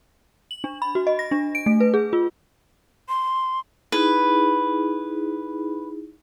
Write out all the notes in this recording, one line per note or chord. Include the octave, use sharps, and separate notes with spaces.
F#7
D4
B5
F#4
D#5
A#6
D4
D7
A3
B4
G#4
F4
C6
D#4 E4 G#4 B4